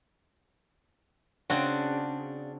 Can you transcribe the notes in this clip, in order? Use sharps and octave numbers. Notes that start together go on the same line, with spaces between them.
C#3 C4 D4 F#4